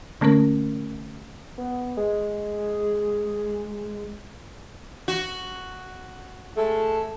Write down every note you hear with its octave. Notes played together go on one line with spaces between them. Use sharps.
D3 A3 A#3 C#4 A#4
B3
G#3 G#4
F#4
G#3 A3 A4